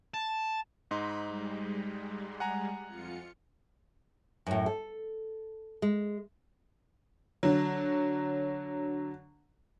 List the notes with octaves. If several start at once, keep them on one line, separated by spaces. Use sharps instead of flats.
A5
G#2 D#4 B5 C6
G3 G#3
F#5 G#5 A#5
F2 F4 C#7
F#2 A2
A4
G#3
D3 F#3